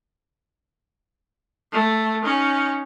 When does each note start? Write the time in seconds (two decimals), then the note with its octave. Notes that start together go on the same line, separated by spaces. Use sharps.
1.72 A3
2.23 C#4 D#4